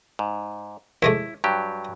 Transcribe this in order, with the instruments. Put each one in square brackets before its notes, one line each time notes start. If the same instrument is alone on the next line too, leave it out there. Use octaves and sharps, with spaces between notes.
[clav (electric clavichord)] G#2
[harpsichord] D#2 G#3 A3 [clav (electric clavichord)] E4
[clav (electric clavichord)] G2 F#3 G4